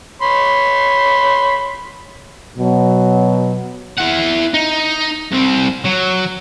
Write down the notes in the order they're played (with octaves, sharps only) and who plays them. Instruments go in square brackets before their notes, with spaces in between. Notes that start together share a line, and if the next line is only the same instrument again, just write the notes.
[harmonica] C#5 B5 C6
[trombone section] B2 F#3
[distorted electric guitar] E4 F#5
D#4
C2 C4
F#3